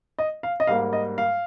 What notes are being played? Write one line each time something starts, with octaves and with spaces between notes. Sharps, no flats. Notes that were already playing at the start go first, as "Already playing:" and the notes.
D#5
F5
D#5
G#2 G3 A#3 F5
D#5
F5